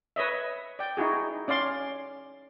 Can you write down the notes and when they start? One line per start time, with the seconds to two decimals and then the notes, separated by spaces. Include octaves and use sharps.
0.16 B4 C#5 D#5 E5
0.79 D5 G5
0.97 D#4 E4 F#4 G#4
1.48 C#4 D5 F5 C6